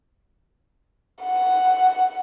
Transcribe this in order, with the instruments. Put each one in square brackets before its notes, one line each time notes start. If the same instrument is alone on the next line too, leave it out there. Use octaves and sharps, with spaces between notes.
[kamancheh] F#5